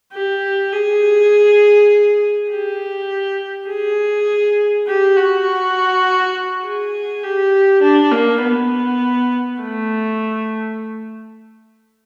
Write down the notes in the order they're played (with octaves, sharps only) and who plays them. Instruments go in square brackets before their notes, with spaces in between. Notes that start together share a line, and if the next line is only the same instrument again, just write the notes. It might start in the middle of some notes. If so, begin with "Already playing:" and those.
[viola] G4
G#4
G4
G#4
G4
F#4
G#4
G4
D4
A#3
B3
A3